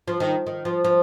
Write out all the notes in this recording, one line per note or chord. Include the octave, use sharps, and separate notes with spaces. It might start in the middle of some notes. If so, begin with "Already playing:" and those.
F3
D#3
D#3
F3
F3